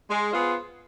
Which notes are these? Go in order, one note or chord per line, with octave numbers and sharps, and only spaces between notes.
G#3
B3 F4 G#4 C5